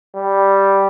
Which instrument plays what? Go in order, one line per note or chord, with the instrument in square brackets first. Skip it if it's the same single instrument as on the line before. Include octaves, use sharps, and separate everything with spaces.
[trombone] G3